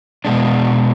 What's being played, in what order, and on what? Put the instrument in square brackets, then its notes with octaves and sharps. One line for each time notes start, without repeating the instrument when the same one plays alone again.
[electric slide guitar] B2 G#3 D4